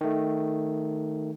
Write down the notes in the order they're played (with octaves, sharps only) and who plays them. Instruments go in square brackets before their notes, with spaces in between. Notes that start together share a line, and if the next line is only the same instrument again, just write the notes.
[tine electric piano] D#3 A3